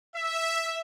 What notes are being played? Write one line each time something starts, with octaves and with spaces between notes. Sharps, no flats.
E5